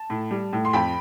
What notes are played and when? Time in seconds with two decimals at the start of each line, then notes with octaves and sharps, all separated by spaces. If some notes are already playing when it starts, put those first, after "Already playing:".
Already playing: A5
0.10 A2
0.31 G3
0.53 A2
0.65 C6
0.73 F2 G5 B5